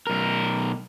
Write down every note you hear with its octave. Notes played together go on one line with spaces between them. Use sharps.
B1 A#4